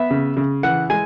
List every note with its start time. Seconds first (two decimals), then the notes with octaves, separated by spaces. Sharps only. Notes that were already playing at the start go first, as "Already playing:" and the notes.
Already playing: B3 E5
0.11 C#3
0.37 C#3
0.63 E3 F#5
0.90 G#3 G#5